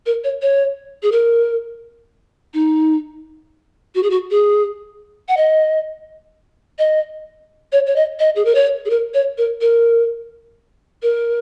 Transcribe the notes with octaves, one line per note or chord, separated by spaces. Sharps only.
A#4
C#5
C#5
G#4
A#4
D#4
F#4
G#4
F#4
G#4
F#5
D#5
D#5
C#5
C#5
D#5
D#5
G#4
A#4
C#5
G#4
A#4
C#5
A#4
A#4
A#4